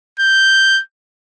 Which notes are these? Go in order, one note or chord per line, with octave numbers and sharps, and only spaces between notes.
G6